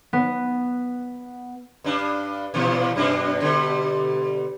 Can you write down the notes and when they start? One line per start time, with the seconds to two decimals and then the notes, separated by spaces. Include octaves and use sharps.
0.13 B3
1.84 G2 D4
2.54 A#2 E3 F3
2.96 F#2 B2 D4
3.40 B2 D3 G3